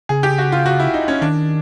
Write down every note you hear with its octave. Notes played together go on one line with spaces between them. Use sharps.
C#3 G#4
G4
F#4
F4
F#4
E4
D#4
C#4
D#3 D4